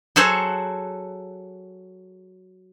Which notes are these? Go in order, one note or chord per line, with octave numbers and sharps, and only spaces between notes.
F#3 G#4 A4 C5 C#5 F#5